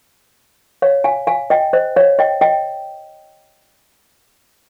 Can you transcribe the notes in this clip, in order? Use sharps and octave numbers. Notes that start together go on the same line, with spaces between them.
C#5 F5
F5 G#5
F5 G#5
D#5 G5
C5 D#5
C#5 F5
D#5 G5
D#5 G5